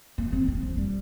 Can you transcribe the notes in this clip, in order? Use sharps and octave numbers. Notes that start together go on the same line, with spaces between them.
A#3
C4
A#3
F3
G3